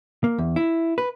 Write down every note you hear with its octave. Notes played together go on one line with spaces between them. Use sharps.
A#3
E2
E4
B4